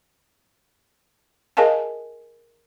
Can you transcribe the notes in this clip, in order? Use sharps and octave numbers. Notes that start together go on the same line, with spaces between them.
G#4 A#4 D#5 F5 G#5 A5